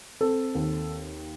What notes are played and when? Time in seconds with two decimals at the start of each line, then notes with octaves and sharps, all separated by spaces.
0.21 C4 A4
0.55 D#2